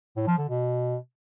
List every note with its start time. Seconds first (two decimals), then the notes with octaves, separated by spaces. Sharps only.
0.16 A2
0.27 F3
0.38 D3
0.49 B2